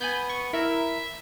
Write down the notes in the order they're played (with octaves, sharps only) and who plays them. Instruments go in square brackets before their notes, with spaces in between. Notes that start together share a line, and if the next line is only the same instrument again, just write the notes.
[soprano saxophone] B3 [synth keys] G#5 B5 G6
[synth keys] C#6
[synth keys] E4 A#4 [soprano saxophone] E5